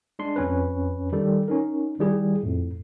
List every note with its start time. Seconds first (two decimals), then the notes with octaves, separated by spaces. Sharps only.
0.19 G#3 D4 C6
0.36 F2 C#4 B4
1.12 D#3 G3 A4
1.48 C#4 D#4 A#4
1.99 D#3 G3 E4 G#4
2.43 F2 A2